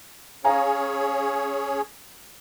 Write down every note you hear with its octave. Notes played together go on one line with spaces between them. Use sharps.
C#4 G#4 C#5 F5 G#5 A#5